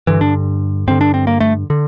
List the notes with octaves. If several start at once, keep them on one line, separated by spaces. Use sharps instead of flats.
G2 D3 E3
D4
G2 D3 C4
D4
C4
A#3
A3
D3